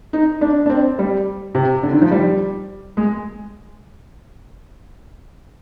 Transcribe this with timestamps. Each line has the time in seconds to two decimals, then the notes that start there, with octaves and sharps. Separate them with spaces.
0.13 D#4
0.41 D4
0.66 D4
0.70 C4
0.99 G3
1.55 C3
1.83 D3
1.92 D#3
2.02 F3
2.11 G3
2.97 G#3